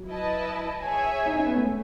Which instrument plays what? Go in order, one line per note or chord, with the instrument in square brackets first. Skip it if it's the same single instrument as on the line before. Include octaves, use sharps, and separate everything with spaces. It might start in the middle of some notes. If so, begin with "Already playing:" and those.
Already playing: [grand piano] F#3
[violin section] E4 B4 D#5 A5
G#4 C#5 E5 G#5
[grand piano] D#4
C#4
B3
A3